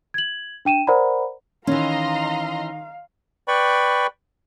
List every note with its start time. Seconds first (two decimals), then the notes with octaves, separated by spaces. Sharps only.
0.14 G#6 F#7
0.65 D4 G5 D#7 E7
0.87 A#4 C5 D5 F#5 A#5 B5
1.67 D#3 E3 C#4 D#5 F5 A#5 C6
3.48 B4 D5 G5 B5 C#6